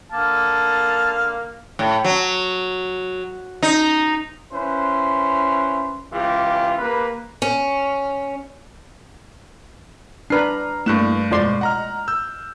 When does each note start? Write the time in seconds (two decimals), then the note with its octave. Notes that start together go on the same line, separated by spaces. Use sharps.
0.12 D3 A#3 F5 A5
1.79 A2
2.05 F#3
3.63 D#4
4.52 C#4 E4 B4 C5
6.13 C#2 E3 F4 G4
6.78 A#3 G4 B4
7.42 C#4
10.30 D4 B4 A#5 F6 C7
10.86 G2 A3 A#3 E4 F#6 E7
11.31 F2 B2 G#3 F4 D5 C6
11.61 D#5 F#5 A#5 F6
12.08 E6 G6